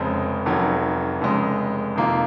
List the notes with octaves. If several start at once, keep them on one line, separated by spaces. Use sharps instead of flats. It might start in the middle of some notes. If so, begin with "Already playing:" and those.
Already playing: F1 F2 C#3 G#3 C4
F1 F2 D#3 F#3 C#4
F1 F2 C#3 G#3
F2 C3 D#3 A#3 F4